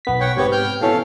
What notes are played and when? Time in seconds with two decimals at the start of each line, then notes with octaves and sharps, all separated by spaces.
0.05 B1 B3 B6
0.20 C#5 F#5 G5
0.36 G#2 C3 B3 G4 C#5
0.52 G5 F6 G6
0.81 B2 E3 C#4 A4 F5